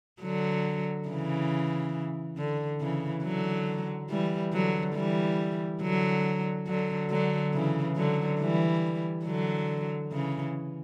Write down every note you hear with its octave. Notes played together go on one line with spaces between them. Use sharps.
D3 F#3
C#3 E3
D3
C#3 E3
D3 F#3
E3 G3
D3 F#3
E3 G3
D3 F#3
D3 F#3
D3 F#3
C#3 E3
D3 F#3
E3 G3
D3 F#3
C#3 E3